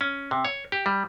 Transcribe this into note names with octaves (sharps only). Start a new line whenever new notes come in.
C#4
C3
C#5
G4
G3